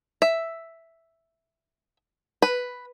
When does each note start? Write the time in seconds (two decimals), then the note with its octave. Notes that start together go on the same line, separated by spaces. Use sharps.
0.22 E5
2.42 B4